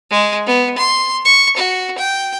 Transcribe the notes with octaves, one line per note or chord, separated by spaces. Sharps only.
G#3
B3
C6
C#6
F#4
G5